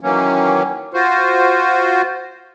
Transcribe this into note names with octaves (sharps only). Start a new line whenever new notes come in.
D#3 E3 F#3 A#3 C#4
F4 F#4 C5